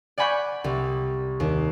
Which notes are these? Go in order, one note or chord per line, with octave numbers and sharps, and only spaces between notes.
D5 F#5 G#5 B5 C#6 G6
C2
D#2